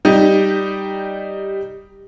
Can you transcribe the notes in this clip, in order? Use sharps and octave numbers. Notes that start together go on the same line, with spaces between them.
G3 D#4 G4